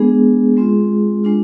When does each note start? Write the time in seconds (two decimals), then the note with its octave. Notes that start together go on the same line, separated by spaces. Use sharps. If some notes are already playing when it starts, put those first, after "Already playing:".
Already playing: G#3 B3 D4 G#4
0.57 G#3 C4 F4
1.24 G#3 D4 F4